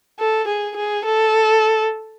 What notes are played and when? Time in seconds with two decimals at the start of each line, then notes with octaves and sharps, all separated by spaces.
0.19 A4
0.48 G#4
0.76 G#4
1.05 A4